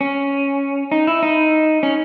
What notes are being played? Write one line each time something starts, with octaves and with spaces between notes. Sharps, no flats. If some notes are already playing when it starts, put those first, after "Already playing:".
C#4
D#4
E4
D#4
C#4